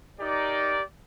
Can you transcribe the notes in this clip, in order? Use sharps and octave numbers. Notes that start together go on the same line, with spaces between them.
D#4 G4 A#4 D5